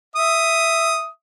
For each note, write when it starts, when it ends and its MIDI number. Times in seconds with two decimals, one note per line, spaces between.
0.16 1.07 76
0.16 1.07 87